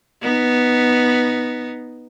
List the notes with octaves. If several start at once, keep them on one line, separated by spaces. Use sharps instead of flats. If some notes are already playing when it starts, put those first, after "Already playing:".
B3 D#4